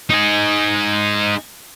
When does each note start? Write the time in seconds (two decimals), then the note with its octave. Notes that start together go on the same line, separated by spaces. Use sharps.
0.10 D#4 G#4